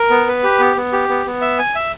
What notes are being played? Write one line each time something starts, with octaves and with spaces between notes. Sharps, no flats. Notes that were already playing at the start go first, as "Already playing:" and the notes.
Already playing: A#4
B3
B4
G4
B3
B3
G4
B3
B3
E5
G#5
E5